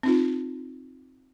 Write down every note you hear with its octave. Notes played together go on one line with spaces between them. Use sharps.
C4 D#4 F4